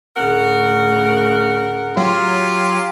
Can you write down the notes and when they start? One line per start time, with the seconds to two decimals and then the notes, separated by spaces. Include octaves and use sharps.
0.17 D2 A2 C#3 A#4 F#5
1.97 F#3 F4 G4